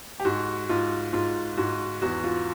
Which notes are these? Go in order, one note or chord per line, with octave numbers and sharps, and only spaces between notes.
G4
G#2 F#4
G#2 F4
G#2 F4
G#2 F#4
E2 F#4
F4